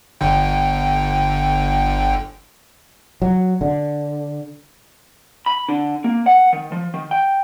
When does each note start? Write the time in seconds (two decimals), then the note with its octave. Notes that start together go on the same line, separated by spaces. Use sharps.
0.21 G1 D3 G5
3.22 F#3
3.61 D3
5.46 B5
5.69 D3
6.04 A#3
6.26 F#5
6.53 D#3
6.72 F3
6.94 D#3
7.11 G5